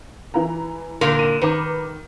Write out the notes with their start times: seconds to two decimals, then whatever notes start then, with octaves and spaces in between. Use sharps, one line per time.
0.34 E3 A#5
1.01 A#2 D3 A#4
1.19 D#7 E7
1.42 D#3 B4 A#5 D6